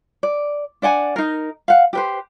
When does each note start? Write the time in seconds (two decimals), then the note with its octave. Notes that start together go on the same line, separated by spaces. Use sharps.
0.23 D5
0.82 D4 D5 F#5 G#5
1.16 D#4 A#4
1.68 F5 F#5
1.93 G4 B4 C5